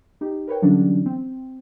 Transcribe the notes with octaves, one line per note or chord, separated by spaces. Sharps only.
D#4 G4
A#4 B4 C#5 G5
D3 E3 F#3 G3 C#4 D4
C4